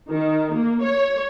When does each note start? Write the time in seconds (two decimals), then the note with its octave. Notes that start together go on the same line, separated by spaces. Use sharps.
0.10 D#3
0.53 A#3
0.84 C#5